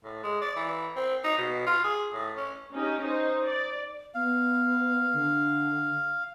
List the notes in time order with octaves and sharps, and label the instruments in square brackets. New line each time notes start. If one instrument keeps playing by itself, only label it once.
[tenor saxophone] A2
G#3
D5
E3
C4
D#4
B2
F4
G#4
A2
C#4
[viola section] C#4 D#4 G4
D#4 C5
D5
[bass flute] B3 [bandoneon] F5
[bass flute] D3